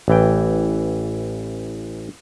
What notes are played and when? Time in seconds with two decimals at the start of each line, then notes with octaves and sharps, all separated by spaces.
0.08 A1 E3 G5